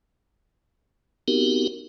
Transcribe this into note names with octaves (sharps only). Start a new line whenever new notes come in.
B3 C4 D#4 F#4 G4 A#4